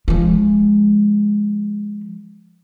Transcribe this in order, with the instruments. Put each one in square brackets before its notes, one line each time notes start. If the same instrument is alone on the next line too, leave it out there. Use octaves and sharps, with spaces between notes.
[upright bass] F3 G#3